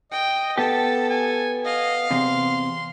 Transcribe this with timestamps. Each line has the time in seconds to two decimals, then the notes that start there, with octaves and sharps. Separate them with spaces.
0.12 D#5 G5
0.58 B3 G4 A4 A5
1.10 G#5
1.65 D#5 F5
2.11 E2 C3 C6